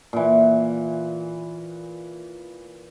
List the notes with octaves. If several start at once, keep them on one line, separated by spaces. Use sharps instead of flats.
A#2 E3